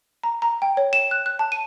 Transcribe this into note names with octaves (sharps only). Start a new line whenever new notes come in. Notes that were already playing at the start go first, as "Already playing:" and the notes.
A#5
A#5
G5
C#5
E7
F#6
F#6
A5
D#7